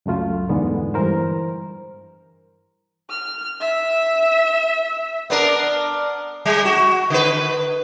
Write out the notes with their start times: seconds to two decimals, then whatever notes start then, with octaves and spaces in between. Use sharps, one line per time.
0.06 C#2 F#2 A3 F4
0.49 E2 G#2 D3 G#3 B3
0.94 G2 E3 A#4 C5
3.10 F6
3.61 E5
5.30 B3 D4 A#4
6.46 G3
6.65 F#4
7.10 D3 B4